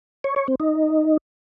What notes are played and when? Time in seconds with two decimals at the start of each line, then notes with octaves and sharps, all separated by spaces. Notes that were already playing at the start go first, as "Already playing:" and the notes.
0.24 C#5
0.36 C#5
0.48 C4
0.60 D#4